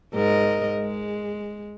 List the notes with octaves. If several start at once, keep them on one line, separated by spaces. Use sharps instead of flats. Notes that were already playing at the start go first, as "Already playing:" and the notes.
G#2 A#4 D#5
G#3